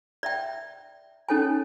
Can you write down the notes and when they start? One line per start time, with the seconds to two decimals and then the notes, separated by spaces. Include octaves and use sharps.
0.23 D5 E5 G5
1.29 C#4 D#4 A4 C#5 G5 G#5